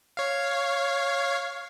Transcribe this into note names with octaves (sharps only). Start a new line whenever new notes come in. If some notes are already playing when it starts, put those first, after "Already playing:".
C#5 F5